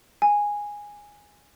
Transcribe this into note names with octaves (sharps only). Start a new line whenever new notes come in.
G#5